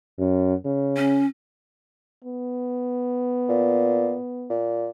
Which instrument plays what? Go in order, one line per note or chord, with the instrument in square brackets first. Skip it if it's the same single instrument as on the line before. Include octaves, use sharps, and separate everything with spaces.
[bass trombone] F#2
C#3
[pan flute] C#4
[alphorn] B3
[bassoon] A#2
A#2